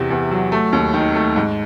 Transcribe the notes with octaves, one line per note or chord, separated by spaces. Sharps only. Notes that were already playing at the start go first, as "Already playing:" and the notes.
Already playing: E2 C3
E2
F#3
A3
D#2
D#3
A3
G#2